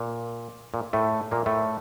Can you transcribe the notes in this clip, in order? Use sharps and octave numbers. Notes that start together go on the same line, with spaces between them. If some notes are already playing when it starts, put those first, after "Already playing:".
Already playing: A#2
A#2
A2 A3
A#2 A#3
A2 A3